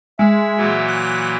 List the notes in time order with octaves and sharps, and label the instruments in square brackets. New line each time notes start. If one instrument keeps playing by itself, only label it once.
[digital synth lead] G#3 [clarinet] E5
[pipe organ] A#2 E3 F#3
[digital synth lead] F#6